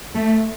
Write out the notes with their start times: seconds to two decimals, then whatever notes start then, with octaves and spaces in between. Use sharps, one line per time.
0.14 A3